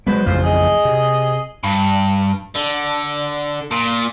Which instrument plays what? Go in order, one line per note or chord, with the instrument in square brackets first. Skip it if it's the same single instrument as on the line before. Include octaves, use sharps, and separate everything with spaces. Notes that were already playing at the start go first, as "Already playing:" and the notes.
[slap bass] F#3 G#3 A#3 [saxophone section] F#4 B4 C5
[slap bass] A1 F2 C#3 [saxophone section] F4 C5
[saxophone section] G#4 D#5
[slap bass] C3
[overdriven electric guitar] G2
D3
A#2